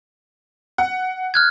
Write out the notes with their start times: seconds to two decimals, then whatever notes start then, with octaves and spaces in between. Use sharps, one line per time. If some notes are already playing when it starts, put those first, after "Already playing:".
0.78 F#5
1.34 F6 F#6 G#6